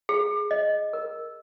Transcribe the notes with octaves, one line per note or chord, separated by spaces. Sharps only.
G#4
D#5
A#4